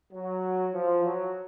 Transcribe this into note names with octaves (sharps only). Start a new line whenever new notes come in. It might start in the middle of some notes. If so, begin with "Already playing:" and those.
F#3
F3
F#3